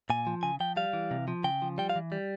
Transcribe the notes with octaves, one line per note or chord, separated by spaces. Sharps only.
A#2 G#5
F3
C#3 G#5
F3 G5
G3 F5
E3
C3
F3
C#3 G5
F3
G3 G5
F5
E3
G3